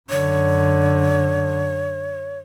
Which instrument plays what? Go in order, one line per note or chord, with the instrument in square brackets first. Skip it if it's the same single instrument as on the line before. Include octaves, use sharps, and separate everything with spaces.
[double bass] F#2 D3 [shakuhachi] C#5